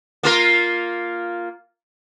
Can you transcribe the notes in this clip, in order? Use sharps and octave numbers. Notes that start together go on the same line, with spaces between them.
A#3 F4 A#4